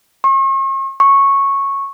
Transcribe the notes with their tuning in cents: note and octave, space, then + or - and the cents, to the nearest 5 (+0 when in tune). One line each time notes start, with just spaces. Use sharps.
C#6 -45
C#6 -10